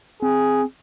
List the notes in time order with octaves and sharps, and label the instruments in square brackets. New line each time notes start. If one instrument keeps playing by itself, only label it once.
[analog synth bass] C4 [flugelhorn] G#4